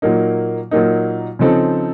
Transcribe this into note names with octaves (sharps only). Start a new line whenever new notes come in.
A#2 F#3 A#3 D#4
A#2 F#3 A#3 D#4
C#3 F3 C4 D#4 A4